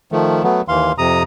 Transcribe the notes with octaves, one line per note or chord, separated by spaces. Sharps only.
D#3 F3 A3
F#3 A3 B3
D#2 E3 F5 C6
F2 C3 A#5 D#6